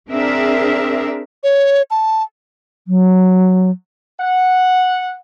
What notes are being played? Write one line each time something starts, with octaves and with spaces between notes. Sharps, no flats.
C4 D4 G#4 A#4 E5
C#5
A5
F#3
F#5